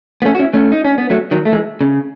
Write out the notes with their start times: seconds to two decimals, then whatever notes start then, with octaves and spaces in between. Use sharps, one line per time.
0.22 B3
0.25 A3 C#4
0.35 F#4
0.39 C#4 E4
0.53 A3 C#4
0.72 D#4
0.84 C#4
0.98 B3
1.10 F#3 A3
1.31 D#3 F#3
1.45 A3
1.52 E3 G#3
1.81 C#3